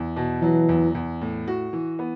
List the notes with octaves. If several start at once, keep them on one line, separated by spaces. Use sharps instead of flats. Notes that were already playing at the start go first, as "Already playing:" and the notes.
Already playing: E2
B2
E3 F#3
E2
E2
A2
F#4
E3
B3